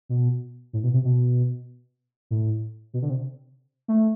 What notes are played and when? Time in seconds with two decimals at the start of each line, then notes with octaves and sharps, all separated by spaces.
0.09 B2
0.73 A2
0.83 B2
0.94 C3
1.04 B2
2.31 A2
2.94 B2
3.02 D3
3.10 C3
3.88 A3